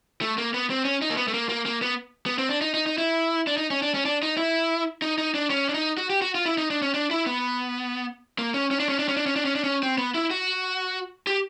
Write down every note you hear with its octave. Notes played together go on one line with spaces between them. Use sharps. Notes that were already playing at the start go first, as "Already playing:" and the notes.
A3
A#3
B3
C4
C#4
D#4
A#3
B3
A3
A#3
A#3
A#3
B3
B3
C4
D4
D#4
D#4
D#4
E4
D4
D#4
C#4
D4
C#4
D4
D#4
E4
D#4
D#4
D4
C#4
D4
D#4
F#4
G4
F#4
F4
E4
D#4
D4
C#4
D4
E4
B3
A#3
C#4
C#4
D4
C#4
D4
C#4
D4
C#4
D4
C#4
D4
C#4
C4
B3
E4
F#4
G4